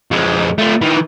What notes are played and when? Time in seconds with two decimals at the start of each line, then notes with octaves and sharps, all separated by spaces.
0.11 F2 G#3
0.58 A3 F4
0.81 D#3 E3